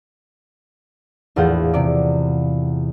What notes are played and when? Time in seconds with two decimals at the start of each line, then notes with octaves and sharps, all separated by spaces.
1.36 A#1 E2 A2 F4 F#5 G6
1.74 C3 D5